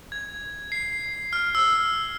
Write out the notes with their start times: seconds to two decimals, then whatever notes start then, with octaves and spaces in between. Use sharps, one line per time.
0.12 G#6
0.72 C7
1.33 F6
1.55 E6